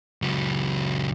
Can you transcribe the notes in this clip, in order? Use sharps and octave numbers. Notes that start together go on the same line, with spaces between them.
C#2 F#3